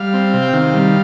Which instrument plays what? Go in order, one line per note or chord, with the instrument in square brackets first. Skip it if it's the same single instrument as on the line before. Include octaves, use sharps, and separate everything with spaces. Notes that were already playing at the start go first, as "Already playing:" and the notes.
Already playing: [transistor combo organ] G3 F5
C4
C3
G5
D#3 F5
G3